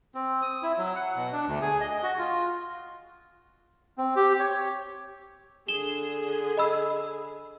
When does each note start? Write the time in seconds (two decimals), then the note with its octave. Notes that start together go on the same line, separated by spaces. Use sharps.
0.15 C4
0.42 D#6
0.63 E4
0.78 F#3
0.96 F#5
1.16 B2
1.33 D4
1.47 D2
1.62 G#4
1.81 D#5
2.03 F#4
2.18 F4
3.98 C4
4.16 G4
4.40 C#5
5.68 D3 G#4 E7 G7
6.57 D#5 B5 E6